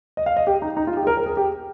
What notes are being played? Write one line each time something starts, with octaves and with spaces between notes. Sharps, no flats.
D#5
F5
D#5
G4
D#4
D#4
F4
G4
G#4
A#4
A#4
G#4
G4